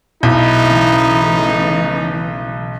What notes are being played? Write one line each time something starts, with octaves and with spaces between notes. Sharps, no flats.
B1 D#4 E4
C#3 E3 A3